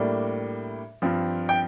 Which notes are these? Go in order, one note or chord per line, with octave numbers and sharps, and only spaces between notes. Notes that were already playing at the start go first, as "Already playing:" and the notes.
Already playing: A2 G3 A#3 D4
G2 F3 C4
G5